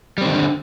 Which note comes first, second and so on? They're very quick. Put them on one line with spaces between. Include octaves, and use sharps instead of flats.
G3 C4 D#3 D3